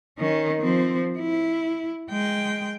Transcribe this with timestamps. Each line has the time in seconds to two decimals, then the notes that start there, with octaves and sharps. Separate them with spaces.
0.19 D#3 C#4
0.62 F3 C4
1.19 E4
2.10 G#3 G5